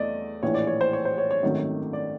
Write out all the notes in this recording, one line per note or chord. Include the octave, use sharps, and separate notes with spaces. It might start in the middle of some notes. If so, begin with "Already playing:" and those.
Already playing: E2 A3 D5 D#5
A#1 A2 E3 C#5
D5
C#5
C5
C#5
C5
C#5
C#5
G#1 F#2 D#3 F#3 A3
D5